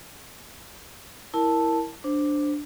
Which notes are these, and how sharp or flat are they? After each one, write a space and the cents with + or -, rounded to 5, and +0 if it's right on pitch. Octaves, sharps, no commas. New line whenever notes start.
E4 +0 A#4 +0 A5 +0
D4 +0 C5 +0